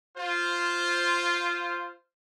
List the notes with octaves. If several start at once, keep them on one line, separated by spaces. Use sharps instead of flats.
F4 C5